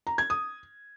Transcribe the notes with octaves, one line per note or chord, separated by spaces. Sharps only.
A#5
G#6
D#6